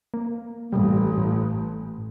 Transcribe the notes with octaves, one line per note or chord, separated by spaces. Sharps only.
A#3
A1 G3
A2